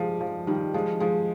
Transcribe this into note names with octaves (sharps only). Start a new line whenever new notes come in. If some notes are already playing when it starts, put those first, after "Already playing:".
Already playing: F3 G3 G#3
F3
D#3 G3
F3 G#3
F3 G#3